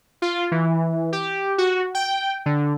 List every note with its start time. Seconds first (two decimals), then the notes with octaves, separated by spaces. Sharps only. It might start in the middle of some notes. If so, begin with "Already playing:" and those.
0.22 F4
0.52 E3
1.13 G4
1.58 F#4
1.95 G5
2.46 D3